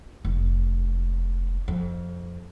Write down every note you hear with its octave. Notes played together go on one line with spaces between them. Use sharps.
F1
F2